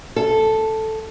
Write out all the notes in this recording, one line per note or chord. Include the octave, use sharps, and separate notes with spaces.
A4